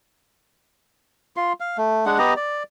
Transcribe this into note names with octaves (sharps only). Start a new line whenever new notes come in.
F4 C6
F5
A3
G#3 D4 F#5
B3 G4 D#5 A#5
D5